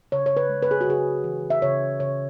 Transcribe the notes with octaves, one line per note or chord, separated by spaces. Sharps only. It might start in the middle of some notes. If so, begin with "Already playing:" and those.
C#3 C#5
C#5
B4
G#3
B4
G#4
F#4
C#3 G#4
E3
E5
C#3 C#5
C#3 C#5